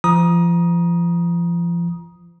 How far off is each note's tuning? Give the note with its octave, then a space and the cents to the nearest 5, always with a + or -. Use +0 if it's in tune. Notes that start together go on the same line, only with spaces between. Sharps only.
F3 -30 A#5 +30 D#6 +0